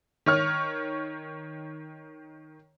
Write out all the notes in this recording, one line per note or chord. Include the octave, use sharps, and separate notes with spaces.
D#3 C#5 F6